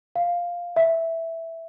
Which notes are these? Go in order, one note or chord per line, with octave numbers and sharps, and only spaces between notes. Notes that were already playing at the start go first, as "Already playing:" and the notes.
F5
E5